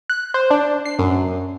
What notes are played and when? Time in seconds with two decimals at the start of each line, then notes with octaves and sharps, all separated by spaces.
0.10 F#6
0.34 C5
0.51 D4
0.85 C7
0.99 F#2